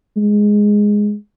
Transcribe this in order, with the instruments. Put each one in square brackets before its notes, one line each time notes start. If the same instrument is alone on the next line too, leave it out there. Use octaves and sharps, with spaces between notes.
[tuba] G#3